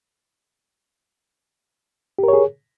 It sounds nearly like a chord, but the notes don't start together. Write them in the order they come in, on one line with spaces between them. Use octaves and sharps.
G4 A#4 C#5 G#4